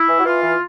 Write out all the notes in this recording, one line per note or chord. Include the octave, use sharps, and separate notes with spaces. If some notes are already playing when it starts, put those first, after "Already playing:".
Already playing: E4
E3
F#4
E3 F4
E3